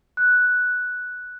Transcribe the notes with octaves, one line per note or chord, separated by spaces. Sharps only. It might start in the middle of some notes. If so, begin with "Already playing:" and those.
F#6